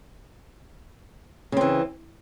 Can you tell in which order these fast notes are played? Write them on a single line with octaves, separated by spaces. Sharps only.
C#3 C4 E3